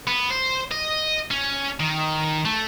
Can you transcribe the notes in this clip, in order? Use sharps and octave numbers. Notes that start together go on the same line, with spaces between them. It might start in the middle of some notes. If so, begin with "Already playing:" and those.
B3
C5
D#5
C#4
D#3
A3